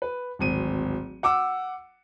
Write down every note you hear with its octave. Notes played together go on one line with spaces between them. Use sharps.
B4
D1 G#1 D#7
F#5 D6 E6